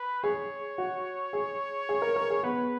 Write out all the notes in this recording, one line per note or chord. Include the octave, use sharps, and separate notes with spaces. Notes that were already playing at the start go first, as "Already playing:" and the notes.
Already playing: B4
G#4 C#5
F#4
G#4
G#4
A#4
A#4
G#4
B3 B4